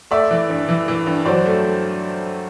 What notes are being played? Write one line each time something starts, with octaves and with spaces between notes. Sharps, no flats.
A3 D5 E5
E3
G2
E3
E3
G2
F#3 C5 D5
A3